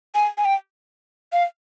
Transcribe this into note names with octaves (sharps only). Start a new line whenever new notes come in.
G#5
G#5
G5
F5